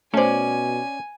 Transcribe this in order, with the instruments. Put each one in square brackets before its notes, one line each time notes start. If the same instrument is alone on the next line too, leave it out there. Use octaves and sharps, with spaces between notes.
[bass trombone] B2 [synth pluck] A3 C5 [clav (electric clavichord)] C#4 D5 [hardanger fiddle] G#5